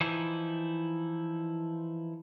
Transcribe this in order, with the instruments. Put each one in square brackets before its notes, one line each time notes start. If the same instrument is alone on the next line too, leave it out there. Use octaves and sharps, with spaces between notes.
[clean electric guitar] E3 F3 D#4 E4